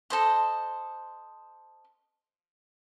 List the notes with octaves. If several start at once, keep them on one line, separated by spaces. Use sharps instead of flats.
A4 C5 D#5